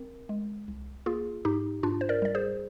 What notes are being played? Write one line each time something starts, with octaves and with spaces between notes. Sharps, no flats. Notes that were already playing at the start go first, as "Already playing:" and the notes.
Already playing: C4 A#4
G#3
C2
A#3 F4 G#4
G#2 D#4 G4
G#2 D4 F4
C5
A#4 D5
G3 D5
G#4 C5